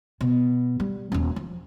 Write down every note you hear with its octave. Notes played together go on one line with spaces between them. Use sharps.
B2
G3
D#1 C#4
F3